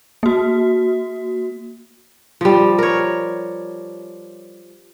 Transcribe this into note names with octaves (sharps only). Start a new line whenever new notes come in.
A#3 F#4
F3 G3
A#4 C#5